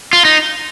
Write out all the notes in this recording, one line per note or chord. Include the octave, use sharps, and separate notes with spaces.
F4
D#4